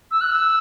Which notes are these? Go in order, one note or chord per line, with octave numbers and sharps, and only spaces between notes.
E6
F#6
E6